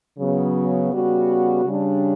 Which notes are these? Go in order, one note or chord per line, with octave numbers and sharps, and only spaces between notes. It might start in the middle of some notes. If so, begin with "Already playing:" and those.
C#3 F#3 B3
C#3 G3 B3 F#4
C#3 G3 D4